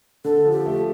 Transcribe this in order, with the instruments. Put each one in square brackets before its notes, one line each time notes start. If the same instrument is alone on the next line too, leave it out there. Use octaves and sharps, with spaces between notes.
[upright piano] D3 [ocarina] A4
[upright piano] F3
[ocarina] G4
[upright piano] A3